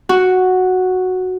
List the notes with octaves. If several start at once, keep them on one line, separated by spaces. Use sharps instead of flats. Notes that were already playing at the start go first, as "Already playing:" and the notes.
F#4